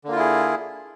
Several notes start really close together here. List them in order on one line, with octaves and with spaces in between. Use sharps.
D3 A#3 F4 E4 G#4